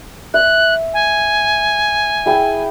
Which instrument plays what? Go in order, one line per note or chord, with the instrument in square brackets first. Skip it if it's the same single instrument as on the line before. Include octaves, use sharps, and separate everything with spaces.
[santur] E5 [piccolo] F#6
[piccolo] G#5
[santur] E4 G#4 G5